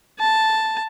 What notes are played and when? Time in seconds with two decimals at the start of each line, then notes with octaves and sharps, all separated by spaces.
0.20 A5